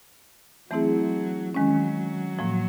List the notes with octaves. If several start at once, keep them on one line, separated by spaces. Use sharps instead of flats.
E3 F#3 A3 C4 E4 G#4
D#3 F#3 G#3 C#4
A2 F3 A#3